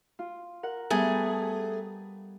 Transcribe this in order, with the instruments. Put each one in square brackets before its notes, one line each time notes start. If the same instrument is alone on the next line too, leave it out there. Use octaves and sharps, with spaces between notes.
[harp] F4
A#4 F#5
[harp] G3 B3 A#5 [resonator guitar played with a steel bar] A3 G#4